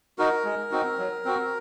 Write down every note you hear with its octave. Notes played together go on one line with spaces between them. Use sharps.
D#4 F#4 A#4
G#3
C4 D#4 F#4
F#3
C4 F#4